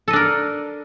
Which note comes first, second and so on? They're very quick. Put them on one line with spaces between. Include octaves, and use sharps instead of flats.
A4 D#5 D4 A#4